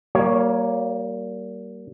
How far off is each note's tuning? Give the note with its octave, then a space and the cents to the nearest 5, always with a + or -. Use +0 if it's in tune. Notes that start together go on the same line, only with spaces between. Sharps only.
G3 -35 A#3 +0 C#5 +0